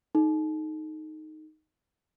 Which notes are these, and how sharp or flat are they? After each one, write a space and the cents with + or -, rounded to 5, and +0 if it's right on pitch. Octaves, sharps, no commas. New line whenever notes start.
D#4 +0 A4 -40